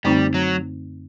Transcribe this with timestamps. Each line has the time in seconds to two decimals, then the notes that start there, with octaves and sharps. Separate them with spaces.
0.04 F#2 D3 G3 A3 C4 D#4
0.34 F#3